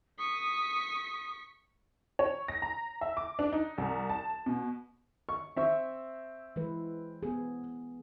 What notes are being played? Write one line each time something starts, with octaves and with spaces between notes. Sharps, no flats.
C#6 D#6 B6
C#5
A#6
A#5
E5
D6
D4
D#4
C2
A5
B2
C#6
C4 E5 C#6
E3 G#3 B4
B3 G#4